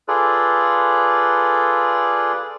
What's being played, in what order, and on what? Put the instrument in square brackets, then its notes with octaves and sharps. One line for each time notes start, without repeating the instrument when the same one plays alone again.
[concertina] F4 G#4 A4 B4 D5